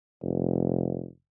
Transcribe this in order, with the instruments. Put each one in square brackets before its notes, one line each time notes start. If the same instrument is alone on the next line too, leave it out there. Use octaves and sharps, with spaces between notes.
[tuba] F1